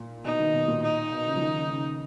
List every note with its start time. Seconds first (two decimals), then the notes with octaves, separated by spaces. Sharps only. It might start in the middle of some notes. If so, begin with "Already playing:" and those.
Already playing: A#2
0.24 B2 D#4
0.39 D#3
0.54 B2
0.68 A#2
0.82 D#4
1.12 B2
1.26 C#3
1.36 F3
1.41 D#3
1.55 C#3
1.70 C#3